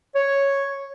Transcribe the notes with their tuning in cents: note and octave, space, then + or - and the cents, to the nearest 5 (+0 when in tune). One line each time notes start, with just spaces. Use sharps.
C#5 +0